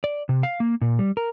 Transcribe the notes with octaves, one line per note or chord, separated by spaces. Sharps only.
D5
C3
F5
A#3
A#2
G3
A#4